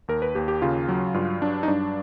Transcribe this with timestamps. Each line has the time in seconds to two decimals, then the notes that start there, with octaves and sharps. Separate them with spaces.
0.08 D#2 A#4
0.22 B4
0.35 D#2 G4
0.48 G4
0.62 C#3 F4
0.89 F#3
1.14 G2 F4
1.41 F#3 D4
1.63 D#4
1.68 G2 D4